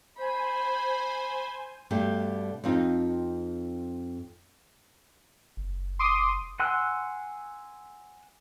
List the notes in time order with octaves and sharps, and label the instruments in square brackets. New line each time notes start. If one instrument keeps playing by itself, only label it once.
[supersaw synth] C5 G#5 [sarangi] B5
[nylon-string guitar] G2 B2 G3 A3
F2 C4 D#4
[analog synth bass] F#1
[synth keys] C6 D6 D#6
[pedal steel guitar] F#5 G#5 C6 E6 F#6